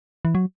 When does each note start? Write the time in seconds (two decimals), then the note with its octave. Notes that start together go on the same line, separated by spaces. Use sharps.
0.25 E3
0.35 F#3